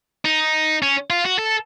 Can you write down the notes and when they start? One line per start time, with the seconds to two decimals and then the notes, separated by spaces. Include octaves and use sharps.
0.25 D#4
0.82 C#4
1.10 F4
1.25 F#4
1.39 A4